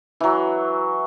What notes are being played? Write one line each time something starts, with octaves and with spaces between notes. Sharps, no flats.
E3 F#3